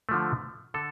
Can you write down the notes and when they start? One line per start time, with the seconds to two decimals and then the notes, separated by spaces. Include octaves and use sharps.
0.09 D3 F3 A3
0.74 D3 A4